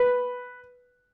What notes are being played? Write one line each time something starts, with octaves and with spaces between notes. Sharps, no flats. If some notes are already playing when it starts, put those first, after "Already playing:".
Already playing: B4